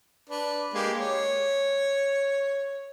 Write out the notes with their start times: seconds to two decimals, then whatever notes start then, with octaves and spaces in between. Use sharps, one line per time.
0.29 D4 B4
0.74 G#3 A#3 G4
1.00 C#5